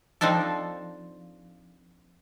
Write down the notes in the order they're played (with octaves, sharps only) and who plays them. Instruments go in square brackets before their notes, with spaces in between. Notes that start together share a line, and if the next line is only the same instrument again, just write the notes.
[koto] F3 C4 D4 D#4 A4